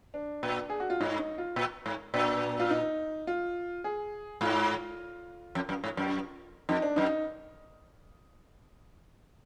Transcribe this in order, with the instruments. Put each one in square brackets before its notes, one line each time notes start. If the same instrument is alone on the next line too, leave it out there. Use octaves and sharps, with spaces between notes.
[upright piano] D4
[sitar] A#2
[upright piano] G#4
F#4
F4
[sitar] G#2 [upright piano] D#4
[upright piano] D#4
F4
[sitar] A#2
G#2
[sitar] A#2 [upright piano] D4
[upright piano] F4
D#4
F4
G#4
[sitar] G#2 [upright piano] F4
[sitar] F2
F#2
G#2
F#2
[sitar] F2 [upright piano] D#4
[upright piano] D4
[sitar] F#2 [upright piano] D#4